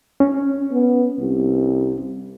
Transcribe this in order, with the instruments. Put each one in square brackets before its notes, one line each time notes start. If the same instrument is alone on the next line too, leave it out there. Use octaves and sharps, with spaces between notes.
[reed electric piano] C#4
[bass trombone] B3
C2